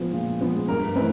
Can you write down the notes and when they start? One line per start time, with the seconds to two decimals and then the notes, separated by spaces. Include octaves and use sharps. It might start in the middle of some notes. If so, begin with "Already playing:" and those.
Already playing: A#2 F3 G#3 B3
0.13 A#2
0.41 F3 G#3 B3
0.68 G2 A#4
0.96 E3 A3 C4 B4